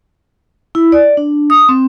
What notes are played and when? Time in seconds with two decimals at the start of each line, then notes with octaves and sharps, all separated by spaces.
0.75 E4
0.92 D5
1.17 D4
1.50 D#6
1.69 C4